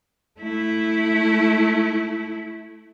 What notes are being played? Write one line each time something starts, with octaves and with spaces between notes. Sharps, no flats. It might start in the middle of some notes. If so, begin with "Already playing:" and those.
A3 E4